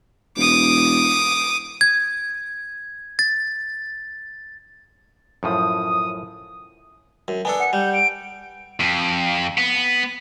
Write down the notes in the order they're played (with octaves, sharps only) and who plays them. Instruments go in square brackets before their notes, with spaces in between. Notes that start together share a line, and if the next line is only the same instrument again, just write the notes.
[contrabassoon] E1 [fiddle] D6 D#6
[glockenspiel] G#6
A6
[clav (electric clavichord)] F#2 A2 F3 [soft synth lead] D#6
[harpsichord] F#2
[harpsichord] B3 D4 A4 [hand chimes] G#5
[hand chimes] F#5 [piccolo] C#7
[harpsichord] G3 [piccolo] G6
[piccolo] D7
[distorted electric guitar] F2
B3